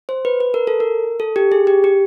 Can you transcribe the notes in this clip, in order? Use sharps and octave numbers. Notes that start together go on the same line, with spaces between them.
C5
B4
B4
A#4
A4
A#4
A4
G4
G#4
G4
G4